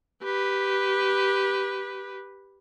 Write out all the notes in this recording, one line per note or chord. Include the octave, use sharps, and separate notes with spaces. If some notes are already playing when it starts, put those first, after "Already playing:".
G4 B4